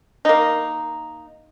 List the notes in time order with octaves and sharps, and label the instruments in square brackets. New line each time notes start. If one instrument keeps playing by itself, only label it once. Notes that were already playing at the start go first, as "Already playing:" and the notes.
[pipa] A#3 D#4